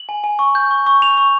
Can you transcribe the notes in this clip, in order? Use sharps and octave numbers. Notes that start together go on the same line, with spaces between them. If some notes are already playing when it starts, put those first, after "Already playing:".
Already playing: F#7
G#5
G#5
C#6
G6
C#6
C#6
C#6 F7
C#6